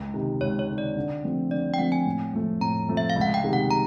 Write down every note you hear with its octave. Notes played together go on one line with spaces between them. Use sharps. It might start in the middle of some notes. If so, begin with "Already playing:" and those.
Already playing: C#2
C3 D#3
C#2 C#5
C#5
C3 D#3
D5
D3
F3 A3 C4
D3 D5
G5
F3 A3 C4 F#5
G#5
A2
F3 A3
A2 A#5
F3 A3
E5
F5
C#2
F#5
G5
C3 D#3 G#3
F#5
A#5